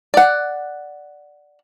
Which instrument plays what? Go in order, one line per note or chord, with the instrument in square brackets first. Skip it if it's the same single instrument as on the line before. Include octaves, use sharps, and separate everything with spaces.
[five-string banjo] D5 F#5